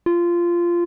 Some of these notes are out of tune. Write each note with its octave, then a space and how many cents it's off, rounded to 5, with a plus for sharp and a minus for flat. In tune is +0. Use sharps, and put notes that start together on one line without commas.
F4 -15